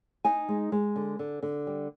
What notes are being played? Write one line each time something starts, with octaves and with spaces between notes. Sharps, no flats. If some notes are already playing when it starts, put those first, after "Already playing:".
D#4 G#5
G#3
G#3
D3
D3
D3
G3